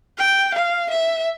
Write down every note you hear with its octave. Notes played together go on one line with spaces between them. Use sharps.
G5
F5
E5